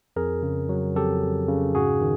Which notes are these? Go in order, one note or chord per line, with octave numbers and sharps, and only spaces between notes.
F2 G#4 A#4
C#3
F#3
F2 G4 A4
F2
C#3
G#2 F#4 G#4
D#3